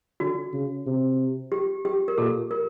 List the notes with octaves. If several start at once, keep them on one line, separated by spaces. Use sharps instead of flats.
D3 F#4
C#3
C3
G4
G4
A#4
A#2 A4
A#4